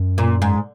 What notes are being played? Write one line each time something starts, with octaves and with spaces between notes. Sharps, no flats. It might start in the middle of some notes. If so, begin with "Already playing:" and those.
Already playing: F#2
A#2
G#2